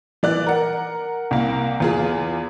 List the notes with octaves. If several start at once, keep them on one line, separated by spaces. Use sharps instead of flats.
E3 D5 F#6
A#4 F#5
C2 A#3
E2 F4 G#4